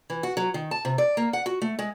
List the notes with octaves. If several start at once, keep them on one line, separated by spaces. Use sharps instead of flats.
E3
F#4
F#3
D#3
A5
C3
D5
A#3
F#5
F#4
A3
G#3